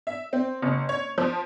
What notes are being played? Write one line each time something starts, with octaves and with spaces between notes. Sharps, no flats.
E5
C4
F#1
C#5
F3